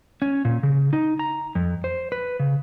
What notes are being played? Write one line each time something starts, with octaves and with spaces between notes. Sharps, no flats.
C#4
A#2
C#3
D#4
A#5
F2
C5
B4
C#3